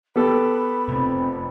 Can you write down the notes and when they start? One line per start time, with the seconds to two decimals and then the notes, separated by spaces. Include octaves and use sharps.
0.16 B3 G4 A4 B5
0.88 C3 A3 C4